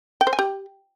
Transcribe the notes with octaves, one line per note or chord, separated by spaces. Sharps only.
G5
C5
G#5
G4